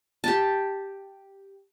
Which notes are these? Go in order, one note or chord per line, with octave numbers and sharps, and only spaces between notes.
G4 A5